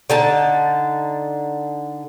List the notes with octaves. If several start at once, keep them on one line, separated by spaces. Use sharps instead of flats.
D3 D#4 A5